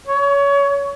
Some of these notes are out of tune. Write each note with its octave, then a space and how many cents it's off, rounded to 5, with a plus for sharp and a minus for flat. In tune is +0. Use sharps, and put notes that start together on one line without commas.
C#5 +25